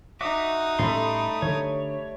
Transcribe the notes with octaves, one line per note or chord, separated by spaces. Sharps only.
D#4 F#4 E5 D6 D#6
A2 G3 A3 C#4 B5 C6
D3 C#5